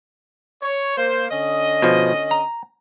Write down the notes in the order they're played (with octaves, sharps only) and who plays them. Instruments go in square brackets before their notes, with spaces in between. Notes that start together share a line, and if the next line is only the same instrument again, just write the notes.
[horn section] C#5
A#3 C5
D3 C#4 D#5
[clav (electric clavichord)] B2 F3
A#5